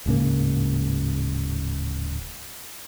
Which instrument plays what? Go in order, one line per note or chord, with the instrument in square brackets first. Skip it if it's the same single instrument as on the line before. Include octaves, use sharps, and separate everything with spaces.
[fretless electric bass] D1 G#2 C#3 A#3